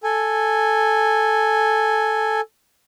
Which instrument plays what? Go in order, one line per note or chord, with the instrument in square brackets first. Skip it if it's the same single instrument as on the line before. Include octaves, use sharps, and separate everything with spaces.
[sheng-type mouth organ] A4 G#5